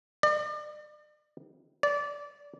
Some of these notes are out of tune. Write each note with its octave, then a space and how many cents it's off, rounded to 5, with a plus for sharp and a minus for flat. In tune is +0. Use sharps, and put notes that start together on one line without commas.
D5 +40
D5 -20